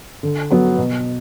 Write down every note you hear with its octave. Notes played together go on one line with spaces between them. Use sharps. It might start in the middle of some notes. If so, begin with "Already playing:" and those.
D3
F#3 B3 F#4
B2